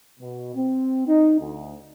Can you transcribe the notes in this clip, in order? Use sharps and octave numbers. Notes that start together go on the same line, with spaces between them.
B2
C4
D#4
D2